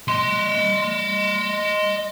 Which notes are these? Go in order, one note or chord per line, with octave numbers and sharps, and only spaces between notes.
D#5 C6